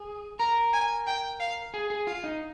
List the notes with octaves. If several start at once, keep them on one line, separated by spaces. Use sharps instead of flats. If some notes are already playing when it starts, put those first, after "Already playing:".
Already playing: G#4
A#4 A#5
G#5
G5
F5
G#4
G#4
F4 F5
D#4